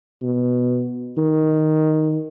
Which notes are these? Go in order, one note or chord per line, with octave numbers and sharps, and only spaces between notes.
B2
D#3